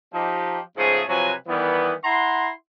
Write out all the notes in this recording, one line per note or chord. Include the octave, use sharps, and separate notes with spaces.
F3 D#4 G4
G#2 C#3 F3 A3 G#4
C3 F3 F#3 F#4 B4 G#5
D#3 E3 G3 B3
E4 F#5 A#5 C6